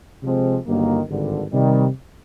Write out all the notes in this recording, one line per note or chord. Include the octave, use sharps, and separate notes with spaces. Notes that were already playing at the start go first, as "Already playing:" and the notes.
C3 F3 G#3 C4
G1 G2 D#3 F#3 A#3
G#1 G2 D3
C3 D#3 G3